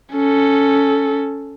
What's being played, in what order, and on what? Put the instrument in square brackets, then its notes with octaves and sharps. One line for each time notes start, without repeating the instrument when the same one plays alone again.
[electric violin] C#4 A4